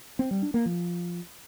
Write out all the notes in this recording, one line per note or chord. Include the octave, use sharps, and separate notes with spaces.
C4
G3
D4
A#3
F3